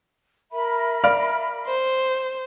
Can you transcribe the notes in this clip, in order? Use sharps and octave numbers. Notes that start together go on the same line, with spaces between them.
A#4 E5 B5
D5 F5 F6
C5